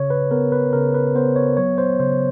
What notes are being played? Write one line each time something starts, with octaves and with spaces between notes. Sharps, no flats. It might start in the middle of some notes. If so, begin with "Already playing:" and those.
Already playing: C#3 C#5
B4
B3 A#4
B4
C#3 A#4
B4
B3 C5
C#5
F#3 C#5
C5
C#3 C5